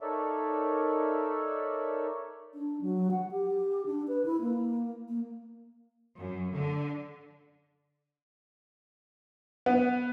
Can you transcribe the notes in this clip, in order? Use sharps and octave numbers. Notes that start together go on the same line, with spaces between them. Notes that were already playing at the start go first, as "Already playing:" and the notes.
D#4 A4 A#4 C#5 D5 E5
D4
F#3
F#5
G4
D4
B4
E4
A#3
A#3
F#2
D3
B3